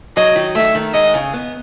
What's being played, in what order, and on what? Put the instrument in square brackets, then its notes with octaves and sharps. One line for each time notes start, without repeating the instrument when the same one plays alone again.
[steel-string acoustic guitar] F#3 [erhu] D#5
[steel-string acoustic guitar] D#3
[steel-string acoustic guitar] A3 [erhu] E5
[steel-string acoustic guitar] D#3
[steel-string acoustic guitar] G#3 [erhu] D#5
[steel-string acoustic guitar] C#3
B3